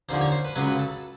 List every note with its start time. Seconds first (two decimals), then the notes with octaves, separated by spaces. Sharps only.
0.09 D#2 D3 F3 C5
0.21 C#5
0.32 C5
0.45 B4
0.55 C#2 C#3 F#3 B4
0.67 B4
0.79 A4